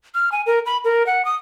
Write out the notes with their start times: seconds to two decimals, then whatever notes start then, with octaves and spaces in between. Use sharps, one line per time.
0.15 F6
0.32 G#5
0.46 A#4
0.66 B5
0.84 A#4
1.07 F#5
1.25 D#6